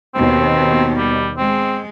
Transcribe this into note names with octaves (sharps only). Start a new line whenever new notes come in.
D#2 B2 D#3 C4
G3
G#3 C4